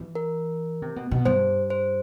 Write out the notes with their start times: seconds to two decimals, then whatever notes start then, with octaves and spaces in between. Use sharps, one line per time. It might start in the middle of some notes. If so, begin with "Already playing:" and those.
Already playing: E3
0.15 A#4
0.82 C3
0.96 B2
1.11 B2
1.25 G2 C5
1.70 C5